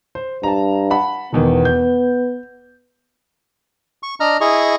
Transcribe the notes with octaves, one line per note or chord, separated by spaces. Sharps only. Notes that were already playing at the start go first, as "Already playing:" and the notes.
C5
G2 A5 A#5
F#5 A5 B5
E1 E2 D#3 B3
G6
C#6
D4 D#5 A#5 F6
E4 G#4 D#5 C#6